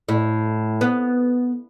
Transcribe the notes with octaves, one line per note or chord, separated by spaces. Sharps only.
A2
B3